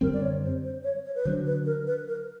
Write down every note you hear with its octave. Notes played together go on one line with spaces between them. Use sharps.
F#2 D3 G3 C4 A#4
D5
C#5
C5
C5
C#5
C#5
B4
D3 F#3 A#3 D4 C5
B4
A#4
B4
A#4